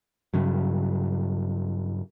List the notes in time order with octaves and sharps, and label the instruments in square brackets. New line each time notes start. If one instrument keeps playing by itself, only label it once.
[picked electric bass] G2 C#3 F#3